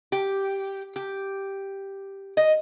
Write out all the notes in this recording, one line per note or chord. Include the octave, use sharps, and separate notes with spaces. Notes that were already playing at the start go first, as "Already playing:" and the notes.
G4
G4
D#5